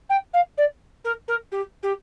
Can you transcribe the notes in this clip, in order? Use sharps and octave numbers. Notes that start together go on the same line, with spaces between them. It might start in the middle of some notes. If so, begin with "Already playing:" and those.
G5
F5
D5
A#4
A#4
G4
G4